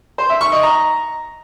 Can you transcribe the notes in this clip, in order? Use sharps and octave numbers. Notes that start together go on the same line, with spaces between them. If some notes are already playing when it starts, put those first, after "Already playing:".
C5
E5
C#6
D#5
A#5